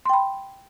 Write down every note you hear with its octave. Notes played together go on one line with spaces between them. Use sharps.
G5 B5 C6